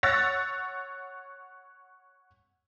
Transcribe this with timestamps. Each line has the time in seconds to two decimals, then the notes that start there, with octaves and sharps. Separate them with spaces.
0.03 C#5 F#5 E6 A6 A#6